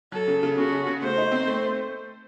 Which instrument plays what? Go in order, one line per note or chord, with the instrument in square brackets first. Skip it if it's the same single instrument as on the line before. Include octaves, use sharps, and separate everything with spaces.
[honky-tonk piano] F#3 [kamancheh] A4
[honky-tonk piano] C#3
C#3
[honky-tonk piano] C#3 [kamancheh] F#4
[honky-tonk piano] C#4
C#3
[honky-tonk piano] A3 [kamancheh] C5
[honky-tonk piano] D#4
C4
A3